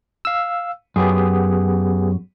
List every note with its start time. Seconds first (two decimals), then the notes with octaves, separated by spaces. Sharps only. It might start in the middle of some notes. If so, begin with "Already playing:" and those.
0.25 F5 E6
0.96 F#2 B3 G4 G#4